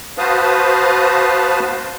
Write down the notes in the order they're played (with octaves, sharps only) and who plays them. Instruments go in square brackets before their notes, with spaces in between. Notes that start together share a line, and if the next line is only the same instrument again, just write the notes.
[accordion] F#4 B4 C5 F5 A5 D#6